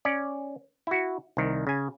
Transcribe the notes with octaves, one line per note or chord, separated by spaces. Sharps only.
C#4 D5
E4 F#4
C2 D#3
C#3 G#5